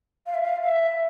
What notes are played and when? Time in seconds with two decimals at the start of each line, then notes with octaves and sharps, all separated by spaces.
0.27 F5
0.34 E5
0.42 F5
0.63 E5